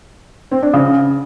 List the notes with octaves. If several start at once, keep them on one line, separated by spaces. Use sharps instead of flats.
C4
D4
C#3